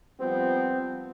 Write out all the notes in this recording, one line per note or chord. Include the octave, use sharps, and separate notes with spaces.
F3 G3 B3 C4